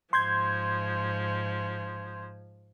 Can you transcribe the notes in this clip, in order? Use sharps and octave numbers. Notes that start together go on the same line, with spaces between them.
G#2 F3 C6 G6 G#6